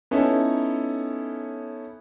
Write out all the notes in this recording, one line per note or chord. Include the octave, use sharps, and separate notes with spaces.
B3 C#4 D#4 E4 A4 C#5